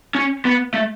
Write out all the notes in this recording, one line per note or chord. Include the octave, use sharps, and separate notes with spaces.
C#4
B3
A3